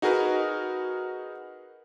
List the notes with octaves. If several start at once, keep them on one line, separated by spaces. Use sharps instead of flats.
D#4 F#4 G#4 A#4 B4